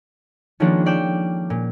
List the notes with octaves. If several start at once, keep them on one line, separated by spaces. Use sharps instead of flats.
D#3 F3 G#3 A#3 C#4 D4
C#4 D5 G5 E7
A#2